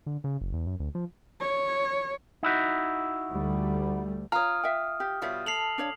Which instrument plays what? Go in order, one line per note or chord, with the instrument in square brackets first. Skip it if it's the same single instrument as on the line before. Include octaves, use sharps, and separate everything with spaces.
[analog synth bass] D3
C#3
F#1
E2
F#2
D2
F3
[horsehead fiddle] C#5
[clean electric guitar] D#4 E4 F#4
[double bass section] D2 G3 A3
[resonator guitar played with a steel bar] F4 [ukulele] C#5 A#5 [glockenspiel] D#6 F6
[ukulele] E5 F5 G5
G4
[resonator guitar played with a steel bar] B2 G3 F4 [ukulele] C#5 E5
[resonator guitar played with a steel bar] A4 [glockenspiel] C7 F7 F#7
[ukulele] D4 C#5 F5